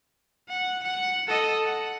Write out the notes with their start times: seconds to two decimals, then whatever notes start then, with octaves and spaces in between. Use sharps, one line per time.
0.49 F#5
0.83 F#5
1.28 A4 D#5
1.65 F#5